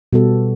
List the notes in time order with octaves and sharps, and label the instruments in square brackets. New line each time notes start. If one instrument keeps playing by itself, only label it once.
[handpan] B2 G3 B3 F#4 A4